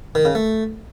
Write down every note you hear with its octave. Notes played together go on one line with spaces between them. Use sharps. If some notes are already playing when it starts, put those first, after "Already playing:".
D#3
C#3
A3